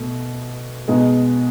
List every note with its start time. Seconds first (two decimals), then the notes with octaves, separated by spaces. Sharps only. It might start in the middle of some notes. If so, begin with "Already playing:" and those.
Already playing: B2 A3
0.88 B2 G#3 B3 D#4